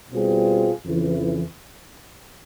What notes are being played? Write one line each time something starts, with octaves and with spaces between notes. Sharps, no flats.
B2 G3 C4 F4 G#4
F2 C#3 E3